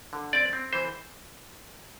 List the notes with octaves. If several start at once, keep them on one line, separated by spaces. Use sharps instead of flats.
D3
C4 D5
C4
E3 C5